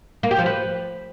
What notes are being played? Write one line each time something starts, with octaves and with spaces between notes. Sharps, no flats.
A#3
G4
F3
B4